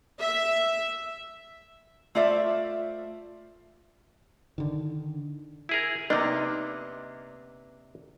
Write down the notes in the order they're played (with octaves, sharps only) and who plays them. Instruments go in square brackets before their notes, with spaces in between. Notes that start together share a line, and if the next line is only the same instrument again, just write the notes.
[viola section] E5
[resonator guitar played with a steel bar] A3 F4 C5 D5 E5
[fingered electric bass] D3 D#3
[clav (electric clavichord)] E4 G#4 A#4
[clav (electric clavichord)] C3 A#3 D4 [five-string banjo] B3 D#4 D#5